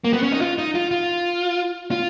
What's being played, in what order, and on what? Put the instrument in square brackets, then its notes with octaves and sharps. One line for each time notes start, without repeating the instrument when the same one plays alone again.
[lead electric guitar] A#3
B3
C#4
D#4
F4
D#4
F4
F4
F4